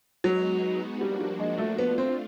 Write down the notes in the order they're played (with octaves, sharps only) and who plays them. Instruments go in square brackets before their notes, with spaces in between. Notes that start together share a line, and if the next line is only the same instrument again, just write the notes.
[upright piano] F#3 [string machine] G#3 B3 D#4 F#4
[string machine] F3 A#3 D4 F#4 [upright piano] G3
[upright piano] G3
G#3
A3
[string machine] A3 D4 F4 [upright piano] B3
[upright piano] C4